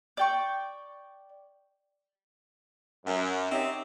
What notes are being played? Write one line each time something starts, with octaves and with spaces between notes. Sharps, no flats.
D5 G5 C#6
F#2
C4 D#4 G4 C#5 E5